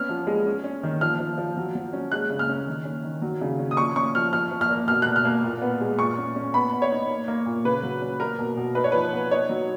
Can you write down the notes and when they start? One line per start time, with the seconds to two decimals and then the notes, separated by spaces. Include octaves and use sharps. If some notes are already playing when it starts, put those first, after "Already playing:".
Already playing: B3 C#4 F6
0.09 F3
0.27 G#3
0.46 C#4
0.64 C#4
0.83 D#3
1.01 F3 F6
1.19 F3
1.37 F3
1.57 F#3
1.75 F#3
1.93 C#4
2.12 G#3 F#6
2.30 C#3
2.39 F6
2.49 C#4
2.67 D#3
2.85 C#4
3.04 D#3
3.22 F#3
3.41 C#3
3.59 C#4
3.71 D#6
3.77 F3 C#6
3.96 C#4 C#6
4.15 F3 F6
4.32 F3 F6
4.51 F3
4.61 F6
4.70 A#3
4.88 B2 F6
5.02 B2 F#6
5.16 F6
5.25 A#3
5.44 A#2
5.62 B3
5.80 G#3
5.99 A#2 C#6
6.18 C#4
6.36 C#4
6.54 B3 B5
6.73 B3
6.82 C#5
6.91 D#4
7.09 A#3
7.28 A#3
7.46 A#2
7.65 C#3 B4
7.83 F#3
8.02 C#4
8.20 A#3 A#4
8.39 B2
8.57 B2
8.75 D#4 B4
8.84 C#5
8.92 F3 B4
9.12 B3
9.31 D#4 C#5
9.49 F#3